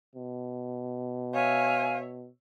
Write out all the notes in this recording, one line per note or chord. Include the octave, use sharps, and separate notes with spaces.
B2
C#5 E5 F5 G#5